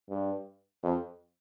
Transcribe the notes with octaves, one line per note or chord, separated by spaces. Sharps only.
G2
F2